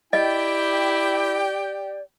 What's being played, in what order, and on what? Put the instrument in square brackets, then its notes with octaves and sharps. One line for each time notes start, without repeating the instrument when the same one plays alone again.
[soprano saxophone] E4 [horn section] G4 G5 [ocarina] D5 [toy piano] D#5